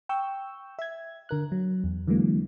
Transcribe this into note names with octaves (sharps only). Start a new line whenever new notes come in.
G5 C#6 E6 G6
E5 G#6
D3 A#4 F#6
F#3
E2
D3 E3 F#3 G#3 A#3